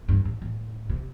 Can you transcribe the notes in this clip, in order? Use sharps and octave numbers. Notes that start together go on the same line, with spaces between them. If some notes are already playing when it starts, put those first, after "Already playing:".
G2
A2
A2
C3